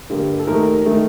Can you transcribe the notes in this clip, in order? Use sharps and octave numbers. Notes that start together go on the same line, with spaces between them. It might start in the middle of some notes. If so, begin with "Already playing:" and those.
G2 D3 G3 A#3
A4
D#2 D#3 A3 A#4
D#3 A3